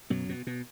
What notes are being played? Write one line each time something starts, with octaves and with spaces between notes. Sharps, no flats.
F#2 B2 F#3
B2
B2